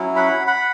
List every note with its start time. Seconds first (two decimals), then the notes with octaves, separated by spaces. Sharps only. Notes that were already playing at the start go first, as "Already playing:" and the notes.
Already playing: F#3 C#4 E4
0.16 F#5 B5
0.47 F#5 B5